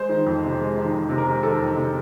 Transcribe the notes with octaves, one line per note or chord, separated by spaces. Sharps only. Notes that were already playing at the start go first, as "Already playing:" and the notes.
Already playing: G#3 C5
D#3
F2
C3
G#3
D#3
F2
C3
A#4
G#3
D#3 A4
F2
C3